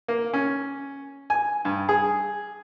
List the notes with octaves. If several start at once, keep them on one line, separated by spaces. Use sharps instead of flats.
A#3
C#4
G#5
G2
G#4